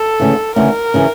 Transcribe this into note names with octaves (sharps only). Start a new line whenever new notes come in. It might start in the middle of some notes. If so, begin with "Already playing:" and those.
Already playing: A4
D2 C#3 E3
D2 C#3 E3 A#4
C#3 E3